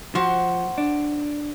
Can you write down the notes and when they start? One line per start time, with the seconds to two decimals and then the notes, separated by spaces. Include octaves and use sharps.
0.15 F3 F#4 C5 F#5
0.78 D4